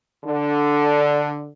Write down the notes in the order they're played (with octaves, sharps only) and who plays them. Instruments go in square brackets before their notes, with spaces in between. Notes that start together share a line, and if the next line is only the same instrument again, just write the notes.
[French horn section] D3